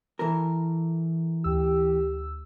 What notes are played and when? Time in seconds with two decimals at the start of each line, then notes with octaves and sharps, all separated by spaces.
0.19 E3 A4 A#4
1.44 D2 G4 E6